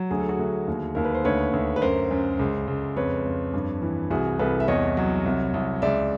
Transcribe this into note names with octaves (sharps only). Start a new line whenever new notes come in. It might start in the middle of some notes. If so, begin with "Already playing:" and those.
Already playing: F#3
D2 G#4
A4
F#4 G#4
D2
D#2
D#2 A#4
B4
C5
D2 B4 C#5
D2
B4
F#2 A#4 C5
F#2
C#2
C#2
F2 B4 C#5
F2
G2
E3
C2 F#4 G#4
C2 A4 B4
E5
E2 C#5 D#5
F#3
C2
C2
C#2 D5 E5